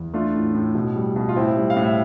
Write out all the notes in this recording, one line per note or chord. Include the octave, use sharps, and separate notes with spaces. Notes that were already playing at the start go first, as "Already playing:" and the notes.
Already playing: E2
A3 D4 F4
A2
A2
B2
G3
B2
F4
A2 C4 E4
G3
F5
A2
E5